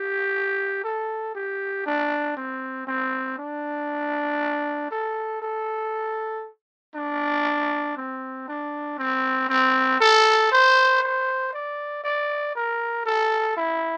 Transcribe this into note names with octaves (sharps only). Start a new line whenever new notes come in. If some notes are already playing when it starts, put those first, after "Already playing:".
Already playing: G4
A4
G4
D4
C4
C4
D4
A4
A4
D4
C4
D4
C4
C4
A4
C5
C5
D5
D5
A#4
A4
E4